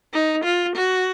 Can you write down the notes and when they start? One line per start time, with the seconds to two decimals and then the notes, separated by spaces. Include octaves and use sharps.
0.13 D#4
0.44 F4
0.76 F#4